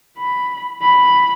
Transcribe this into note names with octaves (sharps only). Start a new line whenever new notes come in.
B5
B5